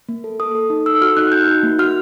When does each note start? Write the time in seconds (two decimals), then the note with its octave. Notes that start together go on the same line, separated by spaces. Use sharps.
0.09 A#3
0.24 A4
0.40 A4 D#6
0.55 A4
0.70 D#4
0.86 A4 E6
1.02 F#4 F6
1.17 D#4 F#6
1.32 F#4 G6
1.48 D#4
1.63 A#3
1.79 F#4 F6